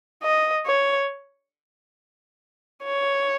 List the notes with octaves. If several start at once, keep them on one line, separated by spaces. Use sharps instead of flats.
D#5
C#5
C#5